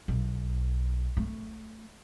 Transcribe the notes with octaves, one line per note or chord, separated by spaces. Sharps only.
B1
A3